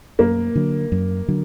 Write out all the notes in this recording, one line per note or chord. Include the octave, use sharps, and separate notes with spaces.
F#2 A#3
D3 F#3
F#2
D3 F#3